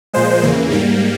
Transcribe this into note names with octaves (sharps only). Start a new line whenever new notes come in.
A#2 F3 G#3 C5
E2 C#3 E3 A#3
G#2 G3 A#3